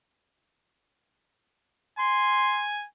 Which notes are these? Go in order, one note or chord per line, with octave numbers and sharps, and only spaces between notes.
G#5 C6